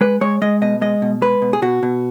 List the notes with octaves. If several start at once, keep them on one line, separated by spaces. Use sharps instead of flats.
G#3 B4
G#3 C#5
G#3 D#5
B2 D#5
G#3 D#5
B2
G#3 B4
B2
G#4
B2 F#4
B2